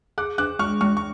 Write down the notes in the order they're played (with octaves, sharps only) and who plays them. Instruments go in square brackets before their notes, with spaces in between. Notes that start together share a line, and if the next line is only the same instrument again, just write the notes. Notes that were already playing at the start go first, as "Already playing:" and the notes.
[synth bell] G#4 [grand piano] D6 F#6
[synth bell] D4 [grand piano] D6 F#6
[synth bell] G#3 [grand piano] C#6 F6
[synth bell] G#3 [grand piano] C#6 F6
[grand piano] C#6